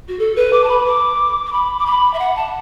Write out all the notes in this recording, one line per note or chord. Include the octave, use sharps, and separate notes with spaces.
F#4
A4
B4
D6
A5
B5
D6
D6
B5
D6
B5
E5
F#5
A5